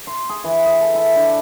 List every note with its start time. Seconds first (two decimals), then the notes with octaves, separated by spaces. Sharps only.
0.07 C6
0.29 G#4
0.44 E3
0.66 G#4
0.80 A4
0.95 E4
1.16 D4